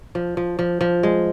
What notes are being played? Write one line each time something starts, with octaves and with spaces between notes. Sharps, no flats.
F3
F3
F3
F3
G#3